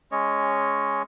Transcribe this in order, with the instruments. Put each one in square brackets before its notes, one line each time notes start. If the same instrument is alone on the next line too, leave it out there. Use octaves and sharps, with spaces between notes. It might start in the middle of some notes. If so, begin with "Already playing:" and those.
[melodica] G#3 C#4 C#5 D#5